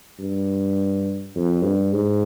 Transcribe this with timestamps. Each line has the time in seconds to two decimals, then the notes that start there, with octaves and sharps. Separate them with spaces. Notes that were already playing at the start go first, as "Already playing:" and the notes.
0.19 G2
1.36 F2
1.64 G2
1.93 G#2